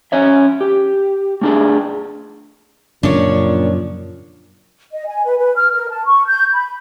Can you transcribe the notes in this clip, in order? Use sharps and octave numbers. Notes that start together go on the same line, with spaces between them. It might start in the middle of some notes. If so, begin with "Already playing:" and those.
C#4 C#5 E5
G4
A3 D4 G#4 D5
F#2 A#2 C#3 F3 D4 C#5
D#5
G#5
B4
B4
F6
A#4
A5
C#6
G6
B5